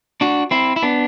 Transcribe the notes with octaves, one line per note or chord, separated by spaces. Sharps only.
D4 F#4
C4 E4
E4
B3 D4